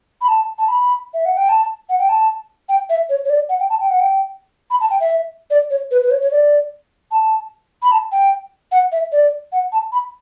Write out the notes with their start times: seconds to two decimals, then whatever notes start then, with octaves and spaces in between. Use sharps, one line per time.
0.21 B5
0.28 A5
0.58 A5
0.68 B5
1.14 E5
1.25 F#5
1.37 G5
1.49 A5
1.89 F#5
1.99 G5
2.09 A5
2.69 G5
2.90 E5
3.09 C#5
3.25 C#5
3.30 D5
3.49 F#5
3.60 G5
3.70 A5
3.80 G5
3.90 F#5
4.00 G5
4.70 B5
4.80 A5
4.90 G5
5.00 E5
5.50 D5
5.70 C#5
5.91 B4
6.03 B4
6.11 C#5
6.22 C#5
6.31 D5
7.11 A5
7.82 B5
7.92 A5
8.12 G5
8.72 F#5
8.92 E5
9.12 D5
9.52 F#5
9.72 A5
9.92 B5